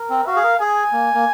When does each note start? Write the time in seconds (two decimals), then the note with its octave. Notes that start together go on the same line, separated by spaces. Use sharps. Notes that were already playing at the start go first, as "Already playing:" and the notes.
Already playing: A#4
0.10 C4
0.26 F#4 F5
0.36 G#4
0.43 A#4
0.60 G#4 G#5
0.92 A#3
1.14 A#3